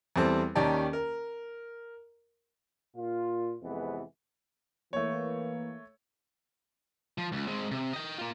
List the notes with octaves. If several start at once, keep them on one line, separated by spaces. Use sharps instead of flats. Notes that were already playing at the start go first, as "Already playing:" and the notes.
E2 G3 C4 A4
D#2 D#3 C#4 G4 D5 A5
A#4
A#2 F4
F2 C3 E3 G#3 B3
E3 A3 A#3 C#5
F3
C#2
G#3 C4
C3
D#5 G5
A#3 F4